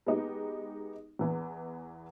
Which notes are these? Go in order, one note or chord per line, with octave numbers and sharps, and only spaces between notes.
G#3 B3 D#4 G4
E2 E3 B3